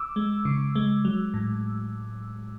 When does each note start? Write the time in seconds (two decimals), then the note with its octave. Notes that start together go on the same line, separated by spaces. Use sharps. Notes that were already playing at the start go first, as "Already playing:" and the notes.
Already playing: D6 E6
0.16 G#3
0.45 C#3
0.75 G#3
1.05 F#3
1.34 A2